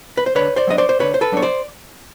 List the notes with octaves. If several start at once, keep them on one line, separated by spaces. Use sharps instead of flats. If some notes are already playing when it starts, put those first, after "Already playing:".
B4
C5
D3 B4 C#5
C5 D5
F#3 B3 D4 D#5
C5 D5
C5
D3 B4 C#5
C5
A4 B4
F#3 B3 D4 C#5
C5 D5